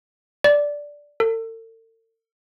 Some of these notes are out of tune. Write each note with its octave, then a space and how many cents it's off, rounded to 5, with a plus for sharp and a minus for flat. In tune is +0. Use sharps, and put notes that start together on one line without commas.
D5 -5
A4 +45